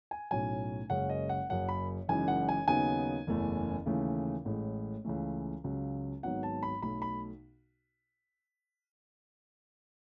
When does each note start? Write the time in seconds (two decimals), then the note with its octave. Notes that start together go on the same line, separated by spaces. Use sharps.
0.11 G#5
0.31 B1 A2 F#3 C#4 G#5
0.90 F#1 F#2 C#3 G#3 C#4 F#5
1.09 D#5
1.29 F#5
1.49 F#1 F#2 C#3 F#3 C#4 F#5
1.69 B5
2.08 F#1 F#2 E3 G#3 D#4 G#5
2.28 F#5
2.49 G#5
2.67 D#2 C#3 F#3 B3 D#4 G#5
3.27 F#1 E2 C#3 E3 A3
3.86 D#2 C#3 E3 A3
4.45 A1 A2 G#3
5.05 C#2 C#3 E3 A3
5.64 C#2 C#3 F#3
6.23 G#1 G#2 F#3 B3 F#5
6.43 A5
6.63 B5
6.82 B1 B2 A3 B5
7.02 B5